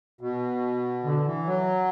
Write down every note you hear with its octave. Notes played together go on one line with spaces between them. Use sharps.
B2
D3
E3
F#3